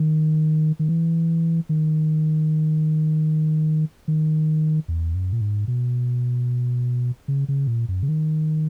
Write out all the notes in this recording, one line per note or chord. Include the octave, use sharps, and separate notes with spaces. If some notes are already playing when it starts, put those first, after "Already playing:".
Already playing: D#3
D#3
E3
D#3
D#3
E2
F#2
A#2
G#2
B2
C#3
C#3
A#2
F#2
C#3
D#3